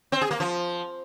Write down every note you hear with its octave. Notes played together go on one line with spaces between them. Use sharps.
C4
G#4
A#3
F3